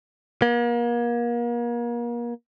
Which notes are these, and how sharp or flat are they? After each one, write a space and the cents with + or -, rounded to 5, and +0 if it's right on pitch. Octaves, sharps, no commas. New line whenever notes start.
A#3 +35